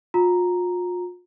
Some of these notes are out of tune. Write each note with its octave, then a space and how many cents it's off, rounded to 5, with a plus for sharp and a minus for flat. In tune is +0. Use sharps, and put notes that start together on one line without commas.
F4 +40 A#5 +0